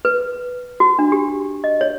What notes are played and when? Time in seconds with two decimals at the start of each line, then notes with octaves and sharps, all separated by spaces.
0.05 B4
0.80 F#4
0.99 D4
1.12 G4
1.64 D#5
1.81 C#5